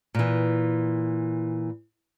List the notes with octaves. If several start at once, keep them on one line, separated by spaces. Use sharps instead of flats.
A#2 E3